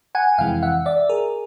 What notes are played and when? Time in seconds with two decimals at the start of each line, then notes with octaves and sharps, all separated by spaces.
0.15 F#5 G#5
0.38 F2 C3 E3 G#3 F5 G5
0.63 E5 F#5
0.86 D5 E5
1.09 G#4 A#4